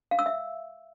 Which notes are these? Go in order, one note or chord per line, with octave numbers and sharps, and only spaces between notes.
F5
E6
E5